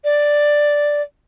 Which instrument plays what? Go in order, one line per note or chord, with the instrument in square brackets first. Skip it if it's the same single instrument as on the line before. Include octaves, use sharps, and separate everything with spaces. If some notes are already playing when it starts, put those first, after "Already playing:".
[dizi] D5